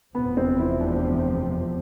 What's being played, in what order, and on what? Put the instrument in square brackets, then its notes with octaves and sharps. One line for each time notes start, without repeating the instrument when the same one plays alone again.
[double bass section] F1 E2 C3 F3 [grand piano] B3
[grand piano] C4
E4
D4